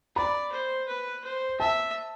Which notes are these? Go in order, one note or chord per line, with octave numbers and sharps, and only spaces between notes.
D5 B5
C5
B4
C5
E5 A5